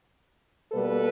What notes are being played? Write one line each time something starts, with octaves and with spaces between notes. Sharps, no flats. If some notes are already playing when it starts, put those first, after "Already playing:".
B2 G3 A#3 A4 B4